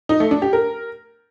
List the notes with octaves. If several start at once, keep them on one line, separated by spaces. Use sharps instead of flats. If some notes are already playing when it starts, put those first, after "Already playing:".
D#4
A3
D4
G4
A#4